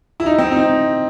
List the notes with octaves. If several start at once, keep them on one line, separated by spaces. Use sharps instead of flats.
E4
D#4
C4
D#4